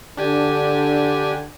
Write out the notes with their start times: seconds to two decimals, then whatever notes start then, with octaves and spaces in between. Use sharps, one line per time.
0.17 D3 D4 G4 G#5